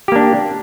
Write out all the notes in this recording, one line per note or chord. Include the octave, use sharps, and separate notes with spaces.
A#3 D4 G4